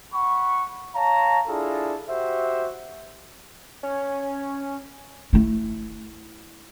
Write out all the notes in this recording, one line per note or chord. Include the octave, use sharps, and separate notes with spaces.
F#5 B5 C#6
C#5 F5 A5 A#5
D4 E4 F4 G#4 A4
F#4 G4 C5 E5
C#4
A3 E4